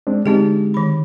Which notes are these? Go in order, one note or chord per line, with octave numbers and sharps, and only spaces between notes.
G#3 C4 D4
D3 G#3 C4 D#4 G4
D#3 B5